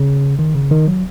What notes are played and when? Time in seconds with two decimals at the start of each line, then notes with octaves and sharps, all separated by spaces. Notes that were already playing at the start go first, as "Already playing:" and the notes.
Already playing: C#3
0.39 D#3
0.55 C#3
0.71 D#3
0.88 F#3